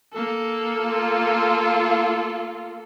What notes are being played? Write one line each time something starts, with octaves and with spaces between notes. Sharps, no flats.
A#3 A4
F4